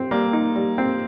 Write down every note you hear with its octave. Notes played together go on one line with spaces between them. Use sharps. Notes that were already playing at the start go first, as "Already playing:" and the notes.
Already playing: C4
G3 A#3
D#4
G3
C4